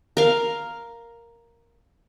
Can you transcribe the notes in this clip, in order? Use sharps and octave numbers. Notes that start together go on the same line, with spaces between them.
A#4 F5